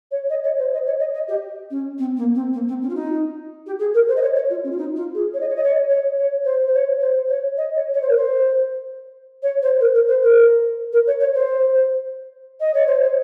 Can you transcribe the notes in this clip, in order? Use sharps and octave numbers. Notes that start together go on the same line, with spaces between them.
C#5
D#5
C#5
C5
D#5
C#5
D#5
D#5
G4
C#4
C4
A#3
C4
A#3
C4
C#4
F4
D#4
G4
G#4
A#4
C5
D#5
C#5
C#5
F4
C#4
F4
D#4
F4
G#4
C#5
D#5
C#5
D#5
C#5
C#5
C#5
C5
C5
C#5
C5
C#5
D#5
C#5
C#5
C5
A#4
C5
C#5
C5
A#4
A#4
C5
A#4
A#4
C#5
C#5
C5
D#5
C#5
C5
C#5